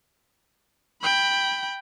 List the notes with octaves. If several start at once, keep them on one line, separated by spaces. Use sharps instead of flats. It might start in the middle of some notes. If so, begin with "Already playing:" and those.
G5 B5